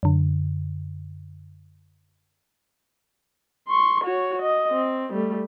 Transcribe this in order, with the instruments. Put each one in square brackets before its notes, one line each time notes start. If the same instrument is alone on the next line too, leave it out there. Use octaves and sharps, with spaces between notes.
[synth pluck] F#2 D3
[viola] C6 C#6
F#4 C#5
D#5
C4
G3 A3